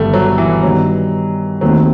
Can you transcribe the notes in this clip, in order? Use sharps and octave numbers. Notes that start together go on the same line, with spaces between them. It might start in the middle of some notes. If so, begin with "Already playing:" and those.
Already playing: G1 G2 D#3 G3 A3
F#3
E3
G2 D#3 F#3 G3 B3 D#4
D#2 D#3 F#3 A3 C4